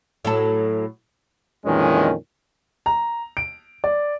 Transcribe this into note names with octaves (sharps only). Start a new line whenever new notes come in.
A2 F#3 A4
F2 A#2 D#3 E3 G#3 C#4
A#5
D7
D5